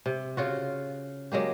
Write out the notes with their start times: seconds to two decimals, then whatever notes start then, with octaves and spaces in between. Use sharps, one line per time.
0.06 C3
0.37 C#3 F4 F#4
1.32 F#3 G#3 A#3 G4